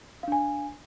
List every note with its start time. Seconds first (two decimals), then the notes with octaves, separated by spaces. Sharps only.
0.23 F5
0.28 D4
0.32 G#5